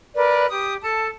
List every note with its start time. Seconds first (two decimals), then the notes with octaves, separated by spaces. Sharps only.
0.16 A#4 B4 D5
0.49 G4 D#6
0.83 A4 A5